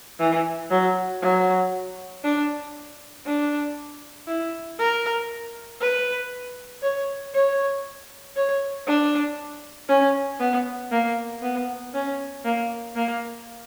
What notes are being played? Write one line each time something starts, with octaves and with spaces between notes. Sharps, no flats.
E3
F#3
F#3
D4
D4
E4
A#4
B4
C#5
C#5
C#5
D4
C#4
B3
A#3
B3
C#4
A#3
A#3